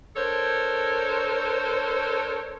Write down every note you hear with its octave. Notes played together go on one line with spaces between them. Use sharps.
D4 A4 A#4 C5 C#5